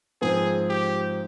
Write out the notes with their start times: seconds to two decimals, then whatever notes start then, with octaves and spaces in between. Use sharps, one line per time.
0.22 G#2 F3 C4 G#4
0.69 G4